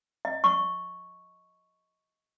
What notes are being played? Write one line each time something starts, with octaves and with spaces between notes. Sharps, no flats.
D#5
C#6